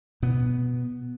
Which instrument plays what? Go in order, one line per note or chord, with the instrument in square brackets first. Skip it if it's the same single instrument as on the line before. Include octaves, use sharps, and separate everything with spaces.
[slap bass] B2 B3